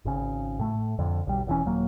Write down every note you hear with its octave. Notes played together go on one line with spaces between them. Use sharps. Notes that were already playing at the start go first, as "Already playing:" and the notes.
G#1 C#3
A2 A3
F2 D3
B1 G3
E1 E3 C#4
D#1 F#3 A#3